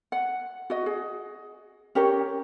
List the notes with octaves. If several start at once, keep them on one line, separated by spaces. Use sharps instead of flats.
F#5
F#4 D#5
G#4
C#4 G4 A#4 C#5